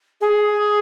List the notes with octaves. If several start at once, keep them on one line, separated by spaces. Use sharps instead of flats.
G#4